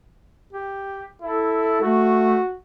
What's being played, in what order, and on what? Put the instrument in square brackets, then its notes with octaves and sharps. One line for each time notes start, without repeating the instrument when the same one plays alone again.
[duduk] G4
[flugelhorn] E4 [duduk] A4
[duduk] A3 [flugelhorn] F#4